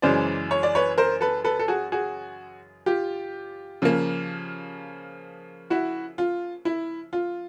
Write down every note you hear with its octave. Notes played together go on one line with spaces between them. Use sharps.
F#2 C#3 E3 G#3 C5 D5
C#5
D5
B4 C#5
A#4 C5
A4 B4
A4 B4
A4
F#4 G#4
F#4 G#4
F4 G4
C#3 F3 A#3
E4 F#4
F4
E4
F4